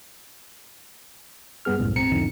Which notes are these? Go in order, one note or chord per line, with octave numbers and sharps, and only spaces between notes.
G2 G3 B3 G#4 F6
C2 F#2 A2
B1 B2 C4 A#5 C#7
E2 G#2 D3 F3 D#4